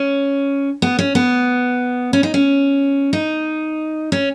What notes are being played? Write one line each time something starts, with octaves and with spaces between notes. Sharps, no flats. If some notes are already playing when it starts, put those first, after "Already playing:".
Already playing: C#4
B3
C#4
B3
C#4
D#4
C#4
D#4
C#4